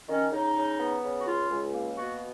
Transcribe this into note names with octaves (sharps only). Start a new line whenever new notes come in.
D#3 C#4
C#3 D#4
C#3
B3
C#3
F#4
C#2 F4
C#2
A#3
B2 F#4